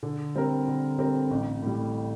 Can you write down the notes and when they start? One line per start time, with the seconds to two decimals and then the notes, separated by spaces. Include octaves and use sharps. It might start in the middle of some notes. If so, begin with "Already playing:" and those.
0.03 D3
0.35 G3 C4 G4 A#4
0.68 D3
0.99 G3 C4 G4 A#4
1.31 A1
1.63 A2 G3